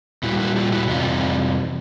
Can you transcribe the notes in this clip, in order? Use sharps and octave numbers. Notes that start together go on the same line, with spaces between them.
A#2 G3 E4 F#4
E4 F#4
F4 G4
E4 F#4
F2 C3 E3 G3 D#4 F4